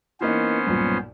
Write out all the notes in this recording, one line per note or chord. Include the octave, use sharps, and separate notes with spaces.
E3 A#3 B3 C#4 D#4 C5
B1 G2 A#2